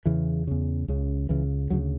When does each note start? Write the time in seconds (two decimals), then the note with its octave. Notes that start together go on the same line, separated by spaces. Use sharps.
0.06 E2 C#3 E3
0.47 E2 C#3
0.88 C#2 C#3
1.29 C#2 C#3 E3
1.70 D2 C#3 F#3